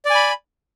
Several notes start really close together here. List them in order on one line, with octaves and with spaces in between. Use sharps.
D5 G#5 B5